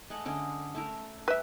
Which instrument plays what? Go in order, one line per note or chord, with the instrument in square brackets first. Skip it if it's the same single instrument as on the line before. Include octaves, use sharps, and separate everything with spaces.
[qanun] G#3 A3 F#5
D3 G#3 C#4
A3 E4 A#4
[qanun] G3 [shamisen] B4 E5